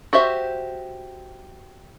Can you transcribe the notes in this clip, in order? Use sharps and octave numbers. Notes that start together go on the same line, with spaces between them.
F#4 G4 C5 E5